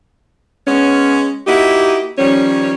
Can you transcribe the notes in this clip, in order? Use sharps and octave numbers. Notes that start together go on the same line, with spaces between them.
G#3 B3 C#4
A#3 D#4 E4 F#4 G4
D#3 F3 G3 C#4